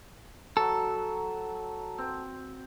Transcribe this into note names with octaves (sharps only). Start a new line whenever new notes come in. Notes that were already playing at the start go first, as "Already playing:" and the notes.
F#3 A4
C4